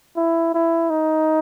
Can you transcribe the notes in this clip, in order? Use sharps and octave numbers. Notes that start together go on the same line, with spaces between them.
E4
E4
D#4